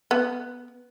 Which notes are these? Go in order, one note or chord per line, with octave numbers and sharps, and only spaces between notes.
B3